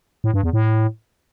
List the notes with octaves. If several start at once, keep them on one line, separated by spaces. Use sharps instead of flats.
A2
G2
E2
A2